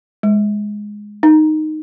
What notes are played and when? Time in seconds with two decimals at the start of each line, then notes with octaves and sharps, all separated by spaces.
0.23 G#3
1.23 D#4